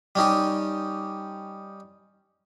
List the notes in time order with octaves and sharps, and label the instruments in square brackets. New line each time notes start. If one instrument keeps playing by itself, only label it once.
[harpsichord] G3 C#4 D#4 G4